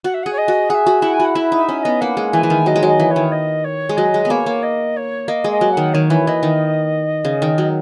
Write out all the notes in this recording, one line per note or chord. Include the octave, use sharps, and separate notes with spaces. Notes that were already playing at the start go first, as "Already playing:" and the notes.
F#4 F#5
E5
G#4 F#5
C#5
D#5
F#4
G#4 E5 F#5
F#4
E4 F#5
G#5
F#4 F#5
E4 E5
D#4
E5
C#4
E5
B3 D#5
A#3 F#5
G#3
E3 G#5
E3
D#3
F#3 D#5
G#3
F#3
D#5
E3
C#5
D#3
D#5
C#5
G#3
F#3 D#5
G#3
B3
A#3 C#5
A#3
D#5
C#5
A#3 D#5
G#3
D#5
F#3
F#5
D#3
D#3 C#5
E3
E3 D#5
D#3
C#3
D#3
F#3